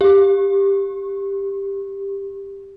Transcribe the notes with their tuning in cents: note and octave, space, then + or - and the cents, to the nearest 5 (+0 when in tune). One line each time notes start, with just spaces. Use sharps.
G4 +10